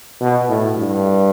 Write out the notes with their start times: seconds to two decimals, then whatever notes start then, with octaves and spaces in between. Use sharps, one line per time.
0.20 B2
0.48 A2
0.78 G2